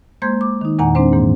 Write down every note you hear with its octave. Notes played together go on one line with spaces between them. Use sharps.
G#3 A#3 C5 C6 G6 G#6
D6
D#3 D#4
E2 A#2 D#3 F#5 G#5 A#5
G#3 C4 D4 C5
G#2 E3 A#3